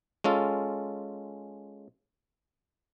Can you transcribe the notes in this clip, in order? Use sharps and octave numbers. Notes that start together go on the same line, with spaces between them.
G#3 C#4 F4 A4